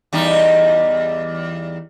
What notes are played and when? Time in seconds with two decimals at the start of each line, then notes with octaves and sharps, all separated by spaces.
0.13 E2 G3 D#4